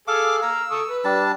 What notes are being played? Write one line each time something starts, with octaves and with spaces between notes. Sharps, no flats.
G#4 A4 F5 D6
F5 A#5 E6
A4 C#6 D#6
B4
G3 D4 A5